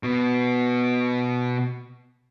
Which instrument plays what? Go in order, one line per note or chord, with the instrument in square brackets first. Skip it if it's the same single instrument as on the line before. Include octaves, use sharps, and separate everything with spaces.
[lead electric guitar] B2 B3